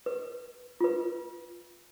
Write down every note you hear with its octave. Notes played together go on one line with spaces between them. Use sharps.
B4
F4 B4